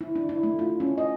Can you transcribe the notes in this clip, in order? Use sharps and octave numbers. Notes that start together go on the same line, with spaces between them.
E4
D4
E4
A3
F4
C#4
D#5